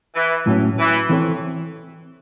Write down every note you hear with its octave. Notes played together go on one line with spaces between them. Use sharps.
E3
A2 F#3 C#4
E3
E3 C4 E4 A4 C#5